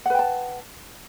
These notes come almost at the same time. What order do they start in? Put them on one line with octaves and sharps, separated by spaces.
F#5 B4 G5 A5